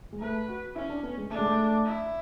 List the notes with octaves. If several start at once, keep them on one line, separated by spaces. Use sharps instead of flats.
G#3
A3 B4
F#4
C#4 E4
D4
B3
G#3
A3 D4
G#3
A3
E4